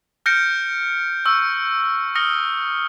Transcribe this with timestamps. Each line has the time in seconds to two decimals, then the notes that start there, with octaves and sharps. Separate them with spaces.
0.26 F6 G6 A#6 C#7 D7
1.25 C#6 E6 F6
2.15 D#6 F6 A#6 C#7 G7